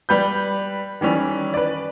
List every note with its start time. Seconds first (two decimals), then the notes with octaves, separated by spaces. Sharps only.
0.09 G3 B4 B5 G6
1.01 D#3 E3 G3 C#4
1.54 B4 D5